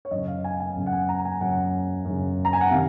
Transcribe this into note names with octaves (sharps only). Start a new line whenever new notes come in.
C#5
F#2 C#3 D#5
F5
G#5
G#5
F#2 C#3
F#5
G#5
A#5
G#5
F#2 C#3 F#5
F#2 C#3
A#5
G#5
F#5
C3 D#3 F5